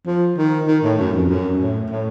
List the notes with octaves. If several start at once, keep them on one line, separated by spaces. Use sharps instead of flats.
F3
D#3
D#3
A2
F#2
F2
F#2
A2
A2